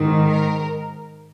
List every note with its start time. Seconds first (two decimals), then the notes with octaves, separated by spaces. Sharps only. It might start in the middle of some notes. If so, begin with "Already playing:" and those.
Already playing: G#2 D#3
0.27 A#4